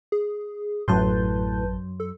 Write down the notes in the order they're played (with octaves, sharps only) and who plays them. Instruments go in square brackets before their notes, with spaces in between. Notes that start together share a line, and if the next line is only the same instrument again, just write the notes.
[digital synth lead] G#4
[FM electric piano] A1 A5 G6 [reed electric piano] F#2 F#3 C6 [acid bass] A2 [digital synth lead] B4
[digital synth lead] A4